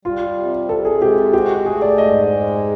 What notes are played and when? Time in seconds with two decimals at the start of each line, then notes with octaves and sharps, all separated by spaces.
0.05 G3 F4
0.37 C3
0.69 C3 A4
0.85 G#4
1.01 G#3 G4
1.33 F#4 G4
1.66 A3 G#4
1.82 D5
1.98 G#2 D#5
2.30 G#3